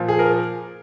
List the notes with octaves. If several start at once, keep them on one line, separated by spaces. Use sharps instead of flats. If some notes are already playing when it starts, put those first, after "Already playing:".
Already playing: A#2 F3
G#4
A#4